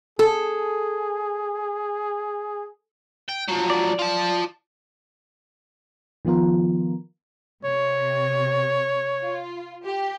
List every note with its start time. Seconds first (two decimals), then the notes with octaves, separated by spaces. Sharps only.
0.19 G#4 A4
3.29 G5
3.48 F3 F#3
3.70 D5
3.99 F4 A5
6.25 D#3 F3 B3 F4 A#4
7.65 C3 C#5
9.22 F4
9.86 G4